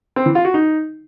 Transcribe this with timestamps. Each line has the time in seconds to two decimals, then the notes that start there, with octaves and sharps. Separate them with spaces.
0.16 C4
0.26 E3
0.35 F4
0.45 F#4
0.54 D#4